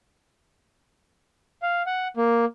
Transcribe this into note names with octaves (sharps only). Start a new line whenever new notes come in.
F5
F#5
A#3